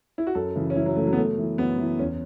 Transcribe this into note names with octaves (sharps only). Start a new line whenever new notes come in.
E4
F#4
F#2 A4
C#3 E3
C#4
F#2 E4
F#3
C#3 E3 A3
F#3
B3
F#2 A3
E3
F#2 B3
E3
E2 C#4